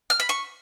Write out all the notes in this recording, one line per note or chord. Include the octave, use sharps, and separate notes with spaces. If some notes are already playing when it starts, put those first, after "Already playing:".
F6
B5
C#6